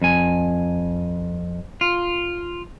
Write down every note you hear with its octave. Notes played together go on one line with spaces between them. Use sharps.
F2 G#5
F4